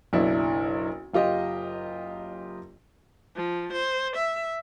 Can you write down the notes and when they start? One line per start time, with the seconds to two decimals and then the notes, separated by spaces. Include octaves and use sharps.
0.13 F#1 B1 D4 E4
1.13 F#1 F4 G4 D#5
3.34 F3
3.73 C5
4.15 E5